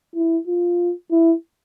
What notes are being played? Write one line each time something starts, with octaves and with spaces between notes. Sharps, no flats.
E4
F4
E4